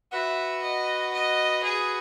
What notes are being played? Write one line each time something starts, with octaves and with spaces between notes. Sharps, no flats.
F#4 B4 E5 F#5
D#5
D#5
G#4